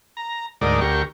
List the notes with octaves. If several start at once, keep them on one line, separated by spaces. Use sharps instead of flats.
A#5
D2 G#2 D#4 A#4 D5
D2 G4 A#4 C#6